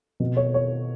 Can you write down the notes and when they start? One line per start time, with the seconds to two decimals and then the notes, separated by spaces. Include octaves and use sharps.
0.20 B2
0.37 C#5
0.54 C#5